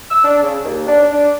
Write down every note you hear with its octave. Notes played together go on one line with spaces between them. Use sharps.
E6
D4
C#3
D#2
D4
D4